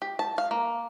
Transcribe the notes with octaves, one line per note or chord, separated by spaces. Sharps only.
G4
A5
F5
A#3